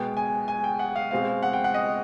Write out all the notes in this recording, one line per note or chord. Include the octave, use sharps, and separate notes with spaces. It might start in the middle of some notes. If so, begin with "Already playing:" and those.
Already playing: B2 G#3 B3 G5
G#5
G#5
G5
F#5
F5
B2 G#3 C4 F5
F#5
G5
F#5
D#5